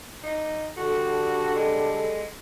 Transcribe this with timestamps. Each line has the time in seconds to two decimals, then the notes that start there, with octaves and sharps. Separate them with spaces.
0.24 D#4
0.77 D3 G3 F#4 A4
1.56 G#3